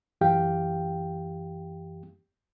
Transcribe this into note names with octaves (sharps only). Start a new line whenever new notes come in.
F#2 E3 G4 F5 G5